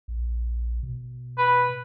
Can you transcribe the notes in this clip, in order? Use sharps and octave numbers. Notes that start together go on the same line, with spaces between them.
A#1
B2
B4